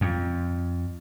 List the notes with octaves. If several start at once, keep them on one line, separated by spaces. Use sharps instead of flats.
F2